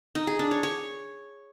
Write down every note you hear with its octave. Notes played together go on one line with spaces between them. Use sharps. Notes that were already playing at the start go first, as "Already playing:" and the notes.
D#4
G#4
D4
C#5
C#5